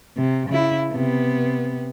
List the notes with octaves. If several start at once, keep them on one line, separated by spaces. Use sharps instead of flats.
C3
C#3 E4
C3 B3